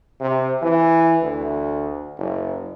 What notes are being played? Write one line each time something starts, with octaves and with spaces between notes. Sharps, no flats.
C3
E3
D2
F#1